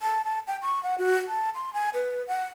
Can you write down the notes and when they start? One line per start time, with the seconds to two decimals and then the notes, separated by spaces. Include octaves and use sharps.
0.02 A5
0.25 A5
0.47 G5
0.62 C#6
0.83 F#5
0.98 F#4
1.28 A5
1.55 C6
1.74 G#5
1.94 B4
2.28 F#5